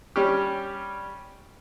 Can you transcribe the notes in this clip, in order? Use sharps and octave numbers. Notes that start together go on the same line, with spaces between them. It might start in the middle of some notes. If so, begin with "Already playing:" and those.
G3 C#4 G4